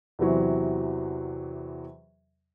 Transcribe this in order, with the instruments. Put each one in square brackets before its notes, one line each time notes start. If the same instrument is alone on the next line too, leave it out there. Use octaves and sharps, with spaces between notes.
[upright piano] E2 C3 E3 F#3 C4